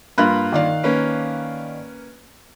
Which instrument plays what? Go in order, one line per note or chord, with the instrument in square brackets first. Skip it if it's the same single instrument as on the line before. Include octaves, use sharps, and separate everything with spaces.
[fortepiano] G2 A#3 F4 [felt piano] B5 F#6
[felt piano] D#3 D5 F5
[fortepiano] A#3 C#4 B4